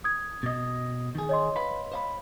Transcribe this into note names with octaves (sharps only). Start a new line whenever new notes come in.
D#6 G#6
B2 D#5
D#3 G#4
C#5 D#5 C6
B4 F5 B5
C5 F5 B5